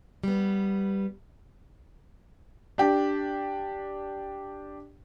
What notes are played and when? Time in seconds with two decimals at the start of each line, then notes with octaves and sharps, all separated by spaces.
0.24 G3 B3
2.78 D4 G4